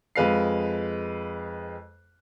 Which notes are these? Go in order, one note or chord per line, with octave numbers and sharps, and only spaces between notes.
F2 G#3 B4 F5 C7